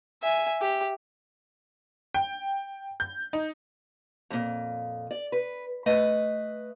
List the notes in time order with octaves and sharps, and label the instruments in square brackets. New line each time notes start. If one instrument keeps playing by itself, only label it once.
[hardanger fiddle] E5 G#5
G4
[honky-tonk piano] G5
G6
D#4
[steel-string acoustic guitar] F2 A#2
D5
B4
A3 B4 D#5